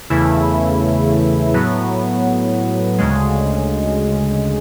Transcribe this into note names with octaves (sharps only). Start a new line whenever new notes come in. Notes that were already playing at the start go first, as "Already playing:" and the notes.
E2 C#3 E3 A3 E4
A2 F#3 B3
D2 C#3 G#3